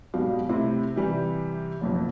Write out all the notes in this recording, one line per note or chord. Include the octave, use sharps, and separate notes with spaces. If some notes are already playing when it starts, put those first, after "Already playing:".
B1 G#2 B2 G3 F5
A2 C3 C4 E4
C3 E3 G3 G4
F#1 B1 F2